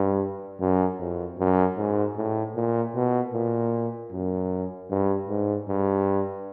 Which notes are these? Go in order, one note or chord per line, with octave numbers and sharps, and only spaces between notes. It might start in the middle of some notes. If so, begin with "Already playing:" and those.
Already playing: G2
F#2
F2
F#2
G#2
A2
A#2
B2
A#2
F#2
G2
G#2
G2